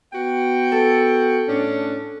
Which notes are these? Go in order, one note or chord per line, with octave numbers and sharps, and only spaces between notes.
B3 F#4 G5
A4
A2 C#4 D4